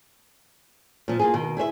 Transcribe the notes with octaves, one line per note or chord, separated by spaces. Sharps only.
A#2 F3
A#3 F4 G#4
B2 D#3
E4 G#4 C5 E5